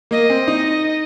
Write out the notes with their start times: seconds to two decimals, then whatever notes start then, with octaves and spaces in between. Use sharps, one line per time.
0.11 A#3 D#5
0.30 C4
0.48 D#4